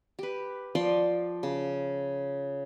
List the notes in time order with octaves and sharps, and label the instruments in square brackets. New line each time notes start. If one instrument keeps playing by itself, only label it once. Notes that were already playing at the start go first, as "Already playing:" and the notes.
[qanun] G4 B4
F3 D5 G5 C6
C#3